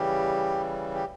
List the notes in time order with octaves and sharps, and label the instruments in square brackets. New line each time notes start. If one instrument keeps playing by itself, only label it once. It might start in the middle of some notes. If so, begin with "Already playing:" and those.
Already playing: [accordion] C#3 E3 G3 G4
G4